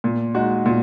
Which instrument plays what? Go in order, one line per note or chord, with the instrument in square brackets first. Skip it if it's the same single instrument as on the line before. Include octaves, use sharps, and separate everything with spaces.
[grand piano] A#2
G#3 D#4 F#4
A#2